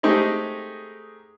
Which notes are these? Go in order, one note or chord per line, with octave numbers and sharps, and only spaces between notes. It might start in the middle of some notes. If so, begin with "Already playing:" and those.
G#3 A3 C4 D#4 G4 G#4